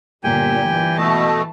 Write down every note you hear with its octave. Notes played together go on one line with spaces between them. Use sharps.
G1 A#2 G4 G5 G#5
E3
B2 A3 D#5 A5